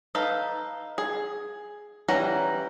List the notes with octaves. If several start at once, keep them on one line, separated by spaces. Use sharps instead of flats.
D#4 A4 B4 F5
G#4
E3 G3 C#4 F#5 A#5